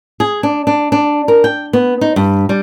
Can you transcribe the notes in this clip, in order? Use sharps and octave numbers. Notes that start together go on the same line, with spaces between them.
G#4
D4
D4
D4
A#4
G5
B3
D#4
G2
G3